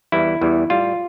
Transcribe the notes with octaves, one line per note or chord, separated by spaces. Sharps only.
E2 E3 G3 E4
E2 E3 G3
A2 G3 F4